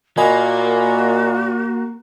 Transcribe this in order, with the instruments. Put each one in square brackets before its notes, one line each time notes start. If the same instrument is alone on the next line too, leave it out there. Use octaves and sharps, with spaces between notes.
[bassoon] A#2 [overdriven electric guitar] A#3 [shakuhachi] F#4 [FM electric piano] D#5 G#5 B5